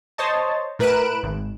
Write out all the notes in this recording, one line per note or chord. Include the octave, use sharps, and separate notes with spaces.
C5 C#5 D#5 A5
A2 A#4 B4 F#6 D7 E7
G#1